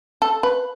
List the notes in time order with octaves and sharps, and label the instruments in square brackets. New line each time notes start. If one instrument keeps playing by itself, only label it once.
[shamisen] A4
B4